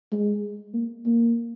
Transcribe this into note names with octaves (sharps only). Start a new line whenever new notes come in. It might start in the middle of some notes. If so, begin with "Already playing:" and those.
G#3
A#3
A#3